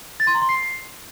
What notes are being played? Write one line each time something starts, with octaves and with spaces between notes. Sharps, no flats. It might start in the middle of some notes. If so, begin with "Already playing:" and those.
A6
C6
A#5
C6
C7